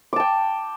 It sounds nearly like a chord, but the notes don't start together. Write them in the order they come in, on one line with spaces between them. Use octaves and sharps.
D6 A5 G5